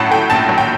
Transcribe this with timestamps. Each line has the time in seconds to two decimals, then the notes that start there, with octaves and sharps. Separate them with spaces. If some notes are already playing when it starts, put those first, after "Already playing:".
Already playing: A2 F#3 F#5 A5
0.11 A3 G5
0.30 A#1 A5
0.49 F#3
0.58 G5